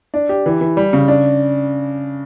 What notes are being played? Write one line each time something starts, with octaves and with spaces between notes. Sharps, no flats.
D4
G4
E3
E3
G3
C#3
D4